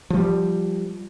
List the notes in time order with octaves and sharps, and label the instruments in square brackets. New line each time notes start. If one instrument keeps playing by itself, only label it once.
[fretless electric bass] F3 G3